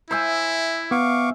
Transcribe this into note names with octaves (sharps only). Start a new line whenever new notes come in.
E4 C5 E5 G#5
B3 F5 C#6 D6